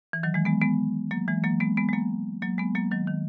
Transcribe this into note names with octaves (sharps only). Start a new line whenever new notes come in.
E3
D#3 F#3
E3 G#3
G#3 B3
G#3 B3
F#3 A#3
E3 G#3
F#3 A#3
G#3 B3
G#3 B3
G#3
F#3 A#3
F#3 A#3
G#3 B3
F#3 A#3
D#3 F#3
D#3